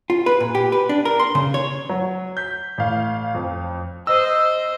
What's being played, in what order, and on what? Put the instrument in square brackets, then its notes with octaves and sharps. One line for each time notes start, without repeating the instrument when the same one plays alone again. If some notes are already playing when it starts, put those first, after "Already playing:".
[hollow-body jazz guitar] F4
B4
A#2
G4
B4
D4
A#4
C6
C#3
C#5
[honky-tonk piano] F#3
G6 B6
A1 F5
F2
[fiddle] C5 [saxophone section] D#5 [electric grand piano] E6